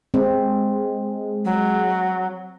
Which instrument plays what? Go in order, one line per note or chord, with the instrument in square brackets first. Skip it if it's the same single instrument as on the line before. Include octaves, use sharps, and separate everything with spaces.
[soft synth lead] G#3 [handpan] C4
[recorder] F#3